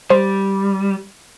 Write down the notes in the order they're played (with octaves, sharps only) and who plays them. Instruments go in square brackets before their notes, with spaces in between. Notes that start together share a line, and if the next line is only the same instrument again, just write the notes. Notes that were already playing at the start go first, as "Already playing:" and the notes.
[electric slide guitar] G3 [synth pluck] C5